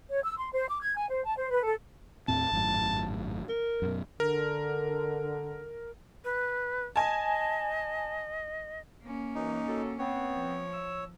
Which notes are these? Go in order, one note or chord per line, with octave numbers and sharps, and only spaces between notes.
C#5
E6
C6
C5
D6
G#6
G#5
C5
A5
C5
B4
A4
D#2 A2 C4 A5
G#1 F#2 A2
A#4
F#2 B2
D3 A#4
B4
D#5 G#5 A5
A#3 C#4
F#2 E3 D#4
F#3 A4
B3 C4 C#5
F3
E6